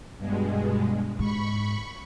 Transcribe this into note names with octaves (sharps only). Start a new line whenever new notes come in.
G2 B2 G#3
G#2 B5 C#6